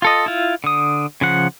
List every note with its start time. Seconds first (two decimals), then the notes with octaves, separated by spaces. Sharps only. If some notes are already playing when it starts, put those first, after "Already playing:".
0.02 F4 A4 D#5
0.26 E4 F4
0.64 D3 D#6
1.21 C#3 F3 F#5